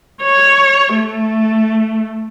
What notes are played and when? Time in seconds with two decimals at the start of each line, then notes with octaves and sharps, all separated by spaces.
0.22 C#5
0.95 A3